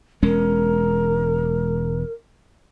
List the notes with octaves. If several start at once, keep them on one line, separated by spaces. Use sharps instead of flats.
E1 G#3 C#4 A#4